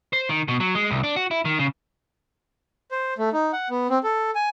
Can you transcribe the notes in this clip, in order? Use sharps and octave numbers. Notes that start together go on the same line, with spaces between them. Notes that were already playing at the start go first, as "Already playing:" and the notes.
C5
D#3
B2
F#3
G#3
C2
D4
F#4
E4
D#3
C#3
C5
A3
D#4
F#5
B3
C4
A4
G#5